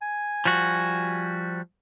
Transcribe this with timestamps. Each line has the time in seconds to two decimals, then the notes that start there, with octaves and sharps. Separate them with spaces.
0.02 G#5
0.45 F3 G3 F#4